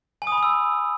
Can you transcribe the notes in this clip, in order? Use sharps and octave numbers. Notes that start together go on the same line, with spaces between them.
G#5
D#6
B5
D#6
E6